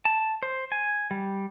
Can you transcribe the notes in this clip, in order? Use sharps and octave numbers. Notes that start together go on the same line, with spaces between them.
A5
C5
G#5
G3